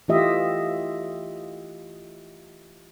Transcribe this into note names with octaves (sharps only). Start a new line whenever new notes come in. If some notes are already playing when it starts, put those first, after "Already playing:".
E3 A3 F4 G4 D#5 E5